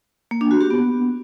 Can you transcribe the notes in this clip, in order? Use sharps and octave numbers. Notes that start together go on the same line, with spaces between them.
A#3
D4
F#4
G4
B3